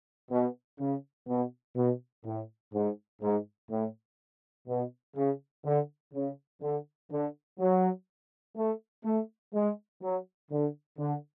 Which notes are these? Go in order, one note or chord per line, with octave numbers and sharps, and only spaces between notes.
B2
C#3
B2
B2
A2
G#2
G#2
A2
B2
C#3
D3
C#3
D3
D3
F#3
A3
A3
G#3
F#3
D3
D3